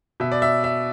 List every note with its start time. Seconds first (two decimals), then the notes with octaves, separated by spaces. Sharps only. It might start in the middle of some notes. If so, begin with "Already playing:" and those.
0.20 B2 E5
0.32 D5
0.42 E5
0.64 E5